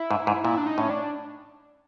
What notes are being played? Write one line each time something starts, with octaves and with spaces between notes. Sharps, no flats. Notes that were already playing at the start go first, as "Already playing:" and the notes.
Already playing: E4
G#2
G#2
A#2 E4
D4
D#4
A2 C#4
D4